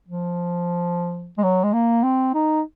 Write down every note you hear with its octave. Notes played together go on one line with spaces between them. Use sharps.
F3
G#3
F#3
G#3
A#3
C4
D#4